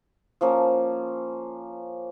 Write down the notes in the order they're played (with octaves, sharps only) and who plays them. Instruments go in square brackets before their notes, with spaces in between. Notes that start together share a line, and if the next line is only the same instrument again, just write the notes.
[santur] F3 A#3 C#4